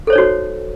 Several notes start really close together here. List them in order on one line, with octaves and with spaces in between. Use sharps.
A4 C5 C#5 D#4 F#4